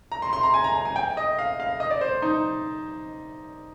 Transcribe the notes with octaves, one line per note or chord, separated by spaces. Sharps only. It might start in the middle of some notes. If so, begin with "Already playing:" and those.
A#5
C6
C6
A#5
G#5
A#5
A#5
G#5
G5
D#5
F5
F5
D#5
D5
C5
D#4